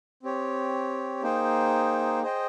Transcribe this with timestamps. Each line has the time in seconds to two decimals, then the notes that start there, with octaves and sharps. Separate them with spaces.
0.23 C4 G4 C#5
1.23 A#3 D#4 G#4 C5 G5
2.22 G#4 C5 D#5 G5